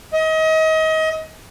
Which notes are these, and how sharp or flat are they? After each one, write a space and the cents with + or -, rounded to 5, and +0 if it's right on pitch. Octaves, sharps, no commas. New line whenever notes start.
D#5 +30